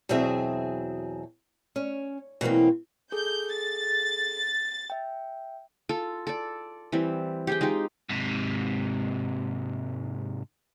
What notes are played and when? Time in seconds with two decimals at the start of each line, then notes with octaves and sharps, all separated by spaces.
0.09 E2 B2 F#3 C4 G#4 E5
1.76 C#4
2.41 B2 E3 F#3 A#3 C4
3.12 G#4 A4 G6
3.53 A6
4.90 E5 G5
5.89 F4 A4
6.27 A4 D5
6.92 E3 G3 C4
7.47 G4 G#4 G5
7.61 G#3 D#4 F4 G4
8.09 G#2 C3